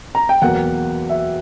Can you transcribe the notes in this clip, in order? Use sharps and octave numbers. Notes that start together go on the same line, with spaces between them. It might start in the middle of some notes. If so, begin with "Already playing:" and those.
A#5
G5
E2 B2 F#3 A#3 F#5
E5